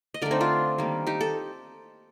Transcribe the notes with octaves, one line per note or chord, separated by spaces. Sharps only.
D#5
D3 A3 A#4 D5
C4 D#4
D4 F4
D#3 G3 A#3
D#4 G4
A4